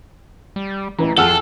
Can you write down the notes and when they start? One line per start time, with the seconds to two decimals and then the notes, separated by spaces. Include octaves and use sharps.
0.56 G3
0.99 A1 E3 B4 A#5
1.18 F2 F4 G#4 A4 F#5 A5 E6 F6